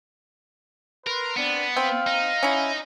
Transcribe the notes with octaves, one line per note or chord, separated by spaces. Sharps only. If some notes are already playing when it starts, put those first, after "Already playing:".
A#4 B4 C6
B3 C4 D4
C4 F5
D#4
C#4 E4